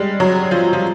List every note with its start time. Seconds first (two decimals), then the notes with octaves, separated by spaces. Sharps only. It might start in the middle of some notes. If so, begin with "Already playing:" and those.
Already playing: G3 G#3
0.20 F#3
0.51 F3
0.73 F3